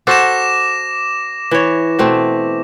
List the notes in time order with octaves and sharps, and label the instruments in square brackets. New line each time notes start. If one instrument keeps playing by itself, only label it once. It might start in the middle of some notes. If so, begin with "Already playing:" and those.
[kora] F#4 A4 C5 [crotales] D6 A#6 E7
[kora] E3 C#5
B2 A3 C4